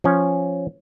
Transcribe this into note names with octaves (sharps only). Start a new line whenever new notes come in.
F3 C#4